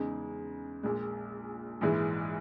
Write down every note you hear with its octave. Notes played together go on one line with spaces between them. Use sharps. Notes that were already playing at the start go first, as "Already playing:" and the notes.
Already playing: E2 C#3 G#3 D#4
A#1 A#2 G#3
A#1 G#2 E3 G#3